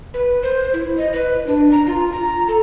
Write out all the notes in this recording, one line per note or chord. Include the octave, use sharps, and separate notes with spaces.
B4
C5
E4
D#5
B4
D4
A#5
F4
A#5
A4